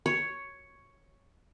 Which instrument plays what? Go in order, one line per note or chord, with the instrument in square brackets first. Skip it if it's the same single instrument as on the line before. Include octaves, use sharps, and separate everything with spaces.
[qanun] C#5